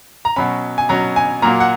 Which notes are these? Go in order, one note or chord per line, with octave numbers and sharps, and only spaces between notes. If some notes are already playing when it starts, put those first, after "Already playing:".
A#5
B2 F#3 C#4 B5
G#5
B2 F#3 C#4 A#5
G#5
A#2 F#3 A#3 A#5
F#5